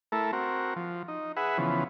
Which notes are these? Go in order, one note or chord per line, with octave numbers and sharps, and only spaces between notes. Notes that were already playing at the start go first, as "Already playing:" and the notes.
A3 E4 A4 A#4
C4 F#4 A#4
F3
D#4
G#4 B4 E5 F#5
C#3 E3 F3 B3